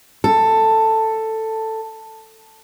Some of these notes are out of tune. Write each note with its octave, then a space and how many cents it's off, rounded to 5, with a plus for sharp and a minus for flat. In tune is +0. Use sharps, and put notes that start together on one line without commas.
A4 +10